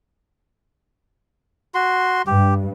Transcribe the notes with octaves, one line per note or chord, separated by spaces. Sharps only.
F#4 C6
G2 G4